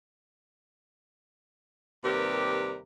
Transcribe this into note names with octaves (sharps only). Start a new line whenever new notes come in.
D#2 C3 G3 G4 A#4 B4